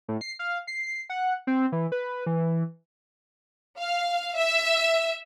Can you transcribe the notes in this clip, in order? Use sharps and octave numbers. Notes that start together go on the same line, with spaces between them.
A2
C7
F5
C7
F#5
C4
E3
B4
E3
F5
E5